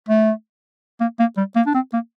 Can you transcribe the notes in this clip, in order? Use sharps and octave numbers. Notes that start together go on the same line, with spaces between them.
A3
A#3
A#3
G3
A#3
D4
C4
A#3